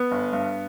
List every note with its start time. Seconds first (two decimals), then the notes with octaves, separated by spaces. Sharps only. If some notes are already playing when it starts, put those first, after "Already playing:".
Already playing: B3
0.11 G1
0.33 G2